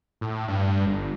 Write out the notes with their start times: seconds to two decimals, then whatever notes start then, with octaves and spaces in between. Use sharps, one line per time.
0.21 A2
0.48 G2
0.87 G1